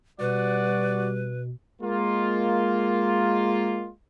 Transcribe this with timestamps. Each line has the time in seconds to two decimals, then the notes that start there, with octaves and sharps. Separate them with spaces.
0.20 B2 G3 F#4 B4 D5
1.82 G#3 A#3 F4